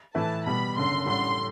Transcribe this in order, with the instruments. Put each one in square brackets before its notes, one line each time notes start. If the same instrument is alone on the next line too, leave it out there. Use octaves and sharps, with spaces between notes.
[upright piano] A2 E3 A3 E4 B4 [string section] A5
[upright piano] B2 G3 B3 [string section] B5
[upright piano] F#1 F#2 D3 [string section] C6
[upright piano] A1 A2 G3 D4 A4 [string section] C6